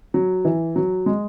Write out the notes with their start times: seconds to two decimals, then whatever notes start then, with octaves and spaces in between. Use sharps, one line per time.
0.14 F#3
0.45 E3
0.76 F#3
1.06 G#3